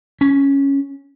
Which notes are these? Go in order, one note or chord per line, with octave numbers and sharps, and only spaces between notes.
C#4